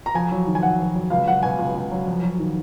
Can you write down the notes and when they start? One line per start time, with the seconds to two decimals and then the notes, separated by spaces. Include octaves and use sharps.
0.06 A#5
0.15 F2 G#5
0.31 F#3
0.47 D#3
0.55 G#5
0.63 F2 F#5
0.79 F2
0.95 F#3
1.10 C#2 F5
1.27 F#3 F#5
1.43 B2 G#5
1.58 C#2
1.75 C#2
1.91 F#3
2.07 F2
2.23 F#3
2.39 D#3